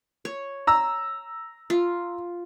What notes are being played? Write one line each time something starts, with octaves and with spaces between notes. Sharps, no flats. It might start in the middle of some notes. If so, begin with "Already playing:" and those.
C#5
A#5 E6
F4